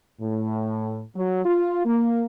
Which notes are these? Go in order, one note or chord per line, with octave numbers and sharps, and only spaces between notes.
A2
F#3
F4
A#3